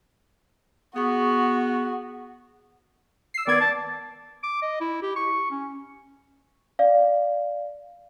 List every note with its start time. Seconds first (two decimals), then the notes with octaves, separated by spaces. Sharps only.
0.96 B3 F#4 G#4 C#6
3.34 E6 C7
3.47 D#3 B3 D5 G#6
3.61 A5
4.43 D6
4.62 D#5
4.81 E4
5.02 G4
5.16 C#6
5.51 C#4
6.79 D5 F5